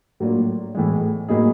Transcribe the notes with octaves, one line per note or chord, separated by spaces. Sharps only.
A2 F#3 A#3 D4 F4
A2 E3 G#3
A2 F#3 A#3 D#4 G#4